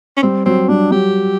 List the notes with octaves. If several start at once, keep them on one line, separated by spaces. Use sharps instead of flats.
C#4
G3 C4
F#3 C4
G3 D4
F#3 G4